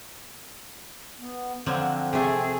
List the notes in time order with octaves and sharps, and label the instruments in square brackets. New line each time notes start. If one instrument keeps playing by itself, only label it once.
[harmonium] B3
[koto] D3 F3 F#3 [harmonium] C4
[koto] C3 A3 [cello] G#4